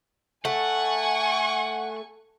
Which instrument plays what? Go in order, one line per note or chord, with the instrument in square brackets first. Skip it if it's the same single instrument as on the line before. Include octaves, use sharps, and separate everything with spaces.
[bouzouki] A3 [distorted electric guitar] F#5 [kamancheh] G#5 C#6